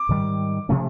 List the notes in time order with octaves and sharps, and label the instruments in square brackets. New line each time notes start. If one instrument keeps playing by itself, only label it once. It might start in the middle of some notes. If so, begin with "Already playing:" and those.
Already playing: [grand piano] D6
[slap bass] G#2 D#3 G3
C3 F3 A3 C#4